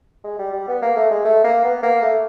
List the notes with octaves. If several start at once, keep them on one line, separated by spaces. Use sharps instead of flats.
G#3
G3
G3
B3
A#3
A3
G#3
A3
A#3
B3
A#3
A3